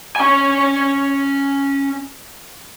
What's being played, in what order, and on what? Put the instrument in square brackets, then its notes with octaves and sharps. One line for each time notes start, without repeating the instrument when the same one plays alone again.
[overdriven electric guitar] C#4 G#5